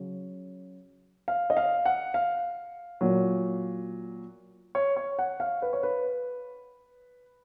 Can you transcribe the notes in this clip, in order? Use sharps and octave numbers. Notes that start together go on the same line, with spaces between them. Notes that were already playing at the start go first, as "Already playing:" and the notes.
Already playing: C#3 F#3
F5
D#5
F5
F#5
F5
A#2 F#3
C#5
C#5
F#5
F5
B4
C#5
B4